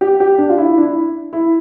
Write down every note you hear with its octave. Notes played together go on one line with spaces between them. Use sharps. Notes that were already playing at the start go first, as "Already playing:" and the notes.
G4
G4
D4
F4
E4
D4
E4
E4